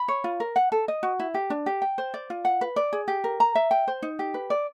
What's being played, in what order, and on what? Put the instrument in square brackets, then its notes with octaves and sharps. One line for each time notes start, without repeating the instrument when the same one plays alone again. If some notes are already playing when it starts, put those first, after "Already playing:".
Already playing: [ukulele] B5
C#5
F4
A#4
F#5
A4
D#5
F#4
E4
G4
D4
G4
G5
C5
D5
F4
F#5
B4
D5
G#4
G4
A#4
A#5
E5
G5
C5
D#4
G4
B4
D5